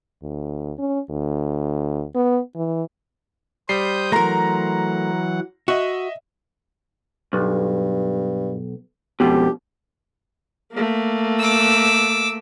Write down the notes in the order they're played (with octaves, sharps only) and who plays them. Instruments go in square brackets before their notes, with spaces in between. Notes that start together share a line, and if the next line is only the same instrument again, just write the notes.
[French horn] D2
C#4
D2
B3
E3
[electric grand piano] G3 C7 [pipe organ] C5 D#6 G6
[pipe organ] E3 F#3 F#5 [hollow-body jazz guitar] A3 A#4 [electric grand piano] A#5 C6 A#6
[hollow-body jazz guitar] F#4 [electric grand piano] D#5 E5
[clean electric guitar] B1 [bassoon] G2
[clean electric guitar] F2 B2 [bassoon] G4
[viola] A3 A#3
[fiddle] D6 E6